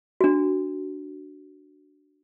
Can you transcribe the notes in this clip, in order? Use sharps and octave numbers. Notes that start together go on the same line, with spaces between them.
D4 F#4